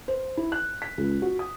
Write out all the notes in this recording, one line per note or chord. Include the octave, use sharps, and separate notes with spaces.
C5
E4
F#6
B6
C#2
F#4
D#6